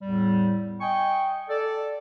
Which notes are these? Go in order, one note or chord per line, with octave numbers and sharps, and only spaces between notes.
E2 A2 G3
D#5 G5 G#5 C#6
A4 D5